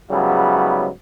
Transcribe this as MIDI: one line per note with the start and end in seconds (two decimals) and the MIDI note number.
0.11 0.89 44
0.11 0.89 49
0.11 0.89 54
0.11 0.89 55
0.11 0.89 59
0.11 0.89 64